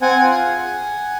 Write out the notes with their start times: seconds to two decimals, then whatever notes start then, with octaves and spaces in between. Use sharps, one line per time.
0.01 C4 F#5 G#5
0.24 F4
0.46 G#4